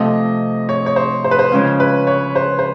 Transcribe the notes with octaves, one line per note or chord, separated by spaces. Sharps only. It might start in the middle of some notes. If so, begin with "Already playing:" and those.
Already playing: C3 F3 A3 D#5
C#5
C#5
C5
C5
B4
C5
C#3 F3 G#3 C#4 F4
B4
C#5
C5
C5